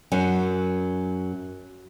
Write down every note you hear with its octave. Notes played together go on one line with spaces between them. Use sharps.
F#2 F#3